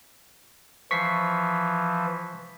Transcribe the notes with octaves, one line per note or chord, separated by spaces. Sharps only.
E3 F3 C#6 B6 C7